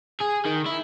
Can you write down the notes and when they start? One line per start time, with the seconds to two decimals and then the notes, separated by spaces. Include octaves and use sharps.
0.20 G#4
0.45 D#3
0.66 E4